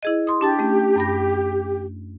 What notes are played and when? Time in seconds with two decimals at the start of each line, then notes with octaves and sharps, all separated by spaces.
0.03 E4 G#4 D#5
0.27 C6 D#6
0.41 D4 G4 A5 A6
0.59 A3 C#4
0.96 F#2 B5 A#6